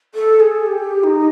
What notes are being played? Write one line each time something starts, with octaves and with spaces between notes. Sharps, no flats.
A4
G#4
G4
D#4